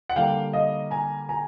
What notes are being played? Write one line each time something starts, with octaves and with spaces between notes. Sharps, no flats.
F#5
D3 G3 A#3 F5 G5
D#5 F5
G#5 A#5
G#5 A#5